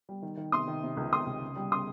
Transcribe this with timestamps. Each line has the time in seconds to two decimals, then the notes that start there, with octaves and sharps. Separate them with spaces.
0.09 G3
0.22 D#3
0.37 D#3
0.52 C3 C6 D#6
0.68 D#3
0.83 C3
0.97 C#2
1.12 C#2 C6 D#6
1.27 C#2
1.42 C#3
1.56 G3
1.71 C#3 C6 D#6